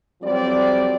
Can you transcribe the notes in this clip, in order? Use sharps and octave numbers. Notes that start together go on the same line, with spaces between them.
F2 F#3 G3 C4 D5